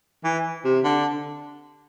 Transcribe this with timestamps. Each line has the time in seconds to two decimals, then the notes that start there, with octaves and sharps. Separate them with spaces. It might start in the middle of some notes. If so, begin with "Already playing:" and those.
0.24 E3
0.65 C3
0.84 D3